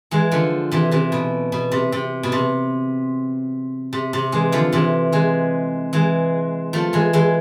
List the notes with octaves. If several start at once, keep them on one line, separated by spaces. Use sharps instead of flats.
E3 G#3
D3 F3
C3 E3
C3 E3
B2
B2
C3
C3
B2
C3
C3
C3
E3 G#3
D3 F3
C3 E3
E3 G#3
E3 G#3
F3 A3
E3 G#3
E3 G#3